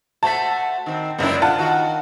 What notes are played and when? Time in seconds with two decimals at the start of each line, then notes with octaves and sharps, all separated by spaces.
0.23 A3 F#4 C5 A5 B6
0.86 D#3 C4
1.19 F#1 C#2 F#2 C4 D4 E4
1.42 D3 F4 F#5 A5
1.58 D#3 F#4